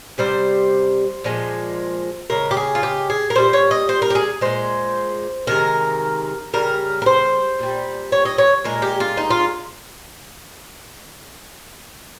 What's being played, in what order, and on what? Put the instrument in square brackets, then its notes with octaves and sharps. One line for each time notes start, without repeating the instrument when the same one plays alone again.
[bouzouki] C3 G3 C5
A#2 F3 G#3
C#3 G#3 A#4
G4
G#4
F4
G4
G#4
A#4
A#2 G3 C5
C#5
D#5
C5
A#4
G4
G#4
A#2 G#3 C5
C3 D#3 G#3 A#4
C#3 G3 A#4
A#4
C5
A#2 G3
C#5
D#5
C#5
A#2 G#3 A#4
G4
F4
D#4
F4